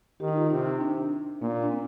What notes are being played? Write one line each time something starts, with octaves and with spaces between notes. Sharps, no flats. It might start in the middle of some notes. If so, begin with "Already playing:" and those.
D#3 G4
D#4
F4
C3 D#4
D#4
D4
A#2 A#3
D4
C4